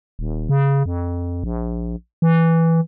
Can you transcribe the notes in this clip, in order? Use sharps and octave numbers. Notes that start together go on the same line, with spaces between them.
D#1
C#3
F2
A#1
E3